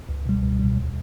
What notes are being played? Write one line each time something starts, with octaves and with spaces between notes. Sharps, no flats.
C#2
B2 G3
C#2
B2 G3
D#2